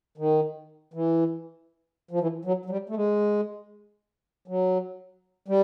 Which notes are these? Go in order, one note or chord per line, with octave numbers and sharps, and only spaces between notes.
D#3
E3
F3
E3
F#3
F#3
G3
A3
G#3
F#3
G3